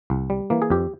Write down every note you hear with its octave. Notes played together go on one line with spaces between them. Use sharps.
C2
G3
E3 A#3
G#4
F2 G4